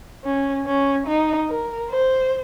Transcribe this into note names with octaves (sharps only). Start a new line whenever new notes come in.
C#4
C#4
D#4
A#4
C5